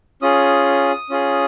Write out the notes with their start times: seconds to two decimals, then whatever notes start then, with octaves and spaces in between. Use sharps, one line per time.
0.22 C#4 F4 G#4 D#6
1.09 C#4 F4 G#4